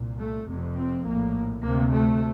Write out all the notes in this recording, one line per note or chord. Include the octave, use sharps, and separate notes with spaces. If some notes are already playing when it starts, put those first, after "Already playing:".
Already playing: C2 A#2
A3
F1 F2 C3
C4
A#1 A2 A#3
D2 C3 A#3
A3